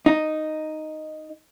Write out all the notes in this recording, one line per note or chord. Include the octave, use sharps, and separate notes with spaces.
D#4